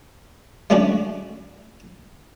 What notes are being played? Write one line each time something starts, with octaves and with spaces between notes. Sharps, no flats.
G#3 A3 C#4 D4 F#4